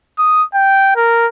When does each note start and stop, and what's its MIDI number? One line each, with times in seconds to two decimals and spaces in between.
0.18 0.43 87
0.54 0.95 79
0.96 1.27 70